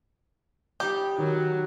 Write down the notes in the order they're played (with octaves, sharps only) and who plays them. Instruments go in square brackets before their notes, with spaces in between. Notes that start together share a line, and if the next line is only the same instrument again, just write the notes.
[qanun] G3 D#4 [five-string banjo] G4
[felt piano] D#3 [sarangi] F#3